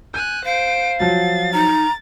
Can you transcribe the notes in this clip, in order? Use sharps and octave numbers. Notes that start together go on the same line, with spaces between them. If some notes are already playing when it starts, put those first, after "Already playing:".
G#5 F#6 G6
C5 F5 D7
F3 F#3 A6
D#4 A#5